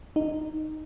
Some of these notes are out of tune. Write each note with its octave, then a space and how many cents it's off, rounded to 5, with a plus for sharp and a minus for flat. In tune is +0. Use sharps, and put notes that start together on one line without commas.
D#4 -10